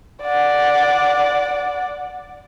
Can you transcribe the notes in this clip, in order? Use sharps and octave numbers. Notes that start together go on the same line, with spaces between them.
D5 F#5